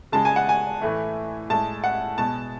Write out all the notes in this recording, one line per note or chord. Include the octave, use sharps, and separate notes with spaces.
C#3 G#3 A5
G#5
F#5
G#5
A2 E3 A3
A2 G#3 A5
F#5
B2 G#3 A5